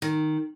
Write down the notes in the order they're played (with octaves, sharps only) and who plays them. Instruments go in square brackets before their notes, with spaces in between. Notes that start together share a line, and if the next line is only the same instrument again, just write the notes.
[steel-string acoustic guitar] D#3